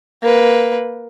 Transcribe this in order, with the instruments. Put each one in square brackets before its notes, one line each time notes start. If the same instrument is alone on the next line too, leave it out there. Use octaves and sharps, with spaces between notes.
[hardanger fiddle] A#3 B4